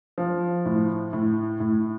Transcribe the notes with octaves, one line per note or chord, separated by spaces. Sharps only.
F3
A2
A2
A2